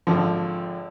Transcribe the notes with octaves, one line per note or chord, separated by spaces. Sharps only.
G#1 D3 F3